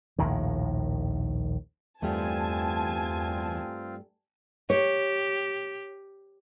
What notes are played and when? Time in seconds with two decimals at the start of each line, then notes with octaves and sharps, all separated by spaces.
0.19 A#1 D#2 A2 D#3
2.02 E2 G2 G3 A3 C4 F4 G#5 A5
4.70 G4 C#5